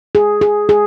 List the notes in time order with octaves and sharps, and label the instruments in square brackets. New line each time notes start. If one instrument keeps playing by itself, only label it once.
[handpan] G#4
G#4
G#4